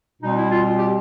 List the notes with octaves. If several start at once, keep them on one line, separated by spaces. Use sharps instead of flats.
B2 G3 C4 D#4
E4
F4
F4
G4